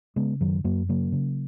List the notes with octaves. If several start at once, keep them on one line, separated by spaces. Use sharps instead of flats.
C#3 G#3 B3
F#2 D#3 F#3
F#2 F#3 A#3
C#3 F#3 A#3
C#3